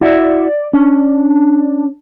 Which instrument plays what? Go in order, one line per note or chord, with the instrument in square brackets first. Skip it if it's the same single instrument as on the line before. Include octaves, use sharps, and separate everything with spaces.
[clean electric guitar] E4 F#4 E5 [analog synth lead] D5
[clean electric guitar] C#4 [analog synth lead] D4